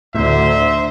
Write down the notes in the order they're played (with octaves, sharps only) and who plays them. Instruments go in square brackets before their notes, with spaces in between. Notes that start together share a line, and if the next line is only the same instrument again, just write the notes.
[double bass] D2 D3 [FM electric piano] A2 [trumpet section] D#4 C5 E5